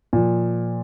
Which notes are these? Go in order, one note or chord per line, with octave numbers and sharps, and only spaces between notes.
A#2 F3